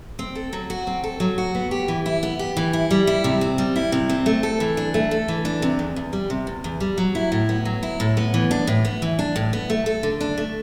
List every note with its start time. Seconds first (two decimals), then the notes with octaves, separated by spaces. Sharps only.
0.19 C4
0.35 A4
0.53 F#3
0.70 F#4
0.87 C4
1.04 A4
1.20 F#3
1.38 F#4
1.55 B3
1.71 G4
1.88 E3
2.06 E4
2.23 B3
2.39 G4
2.57 E3
2.73 E4
2.91 G3
3.07 E4
3.24 C3
3.41 C4
3.58 G3
3.76 E4
3.92 C3
4.10 C4
4.26 A3
4.43 A4
4.60 E3
4.77 D4
4.94 A3
5.11 A4
5.28 E3
5.45 D4
5.62 C3
5.79 E2
5.96 E2
6.13 G3
6.30 C3
6.47 E2
6.64 E2
6.80 G3
6.98 F#3
7.15 E4
7.32 A2
7.49 B3
7.65 F#3
7.83 E4
8.00 A2
8.17 B3
8.34 E3
8.51 D4
8.67 A2
8.85 B3
9.02 E3
9.19 D4
9.36 A2
9.53 B3
9.70 A3
9.86 A4
10.03 D3
10.21 D4
10.38 A3